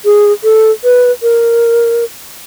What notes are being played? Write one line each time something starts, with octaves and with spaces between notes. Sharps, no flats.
G#4
A4
B4
A#4